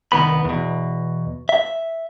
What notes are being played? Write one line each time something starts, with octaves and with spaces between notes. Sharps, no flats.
C2 D#3 B3 B5
E2 B2
E5